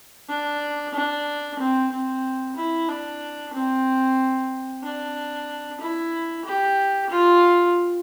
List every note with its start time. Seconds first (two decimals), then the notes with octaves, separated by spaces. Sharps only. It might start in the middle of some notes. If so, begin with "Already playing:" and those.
0.29 D4
0.94 D4
1.59 C4
1.92 C4
2.56 E4
2.88 D4
3.53 C4
4.83 D4
5.80 E4
6.45 G4
7.10 F4